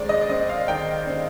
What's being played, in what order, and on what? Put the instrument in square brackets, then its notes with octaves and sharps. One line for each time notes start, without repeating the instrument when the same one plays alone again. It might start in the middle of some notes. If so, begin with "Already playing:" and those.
Already playing: [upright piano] D#3 G#3 C4 D5
D#5
D5
C4 D#5
F5
D#3 G5
C4